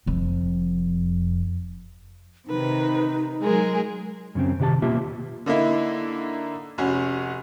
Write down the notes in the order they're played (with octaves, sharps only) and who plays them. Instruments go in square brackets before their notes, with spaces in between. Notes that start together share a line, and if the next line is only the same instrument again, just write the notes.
[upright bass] F1 F2
[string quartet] C3 B4 [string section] D#3 [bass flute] D#4
[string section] F#3 G#3 [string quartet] G#4 A#4
[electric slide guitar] F#2 C#3 C4
C3 D#3 G4 D5 A5
B2 A#3 F4 G4 E5
[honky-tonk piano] D3 A#3 D#4 E4
F1 C#4 F#4